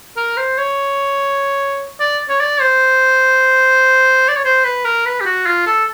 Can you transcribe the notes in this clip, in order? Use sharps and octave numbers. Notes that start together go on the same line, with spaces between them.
A#4
C5
C#5
D5
C#5
D5
C5
D5
C#5
C5
B4
A#4
B4
G4
F#4
F4
A4